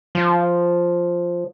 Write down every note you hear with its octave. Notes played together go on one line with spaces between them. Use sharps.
F3